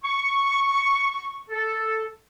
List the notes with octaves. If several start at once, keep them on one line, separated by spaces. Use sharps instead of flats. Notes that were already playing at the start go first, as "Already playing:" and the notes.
C#6
A4